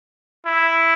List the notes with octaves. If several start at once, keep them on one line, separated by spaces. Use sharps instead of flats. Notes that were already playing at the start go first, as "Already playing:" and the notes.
E4